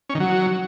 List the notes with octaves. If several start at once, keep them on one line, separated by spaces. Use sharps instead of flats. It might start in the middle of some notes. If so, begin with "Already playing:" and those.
C#4
D#3
F#3